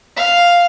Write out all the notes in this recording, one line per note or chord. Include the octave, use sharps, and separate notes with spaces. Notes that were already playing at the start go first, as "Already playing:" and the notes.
F5